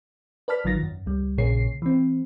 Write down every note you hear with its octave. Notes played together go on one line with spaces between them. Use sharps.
B4 D5 A5 F6 B6
A1 D#3 F#3 F4 A6 A#6
F#2
C#2 G3
A#1 A#2 C#3 G#4 C#5 C7
E3 C4